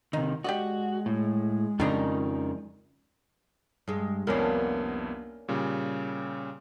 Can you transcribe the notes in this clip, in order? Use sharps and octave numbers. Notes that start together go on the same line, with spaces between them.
C3 D#3 D#4
G#3 F#4 G4 D5 D#5
A2
F2 C#3 F3 G3 D4 D#4 A#4 D#5
G2 G#3
C2 F2 A#3 B3 C#4 D4
A#2 C#3 G3